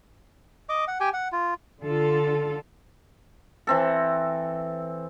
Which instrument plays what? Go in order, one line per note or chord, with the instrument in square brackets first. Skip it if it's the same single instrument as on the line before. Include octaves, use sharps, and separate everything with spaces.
[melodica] D#5 D6
F#5
G4 G5 G#5
F#5
F4
[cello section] D3 F4 A4
[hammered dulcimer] E3 C4 A4